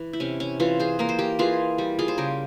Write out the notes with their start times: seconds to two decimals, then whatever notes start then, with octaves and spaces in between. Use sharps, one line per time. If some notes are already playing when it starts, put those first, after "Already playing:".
Already playing: E3
0.13 E4
0.20 C3 C#4
0.40 C#4
0.60 E3 C#4 F4
0.80 G#4 C5
0.99 A#3 A#4
1.09 C5
1.19 G4 A#4
1.39 E3 F4 G#4
1.78 G3
1.99 F4 G#4
2.08 C5
2.18 C#3 G4 A#4